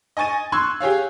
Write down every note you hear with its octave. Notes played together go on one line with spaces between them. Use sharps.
D#5 G#5 C#6 A6 D#7
C6 C#6 E6 F#6 G#6
G4 G#4 C#5 F5